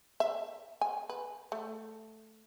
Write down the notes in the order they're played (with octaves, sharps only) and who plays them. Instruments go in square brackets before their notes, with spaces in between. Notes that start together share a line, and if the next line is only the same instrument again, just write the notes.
[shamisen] E5
G#5
B4
A3